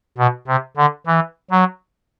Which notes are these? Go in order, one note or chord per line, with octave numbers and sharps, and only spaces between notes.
B2
C3
D3
E3
F#3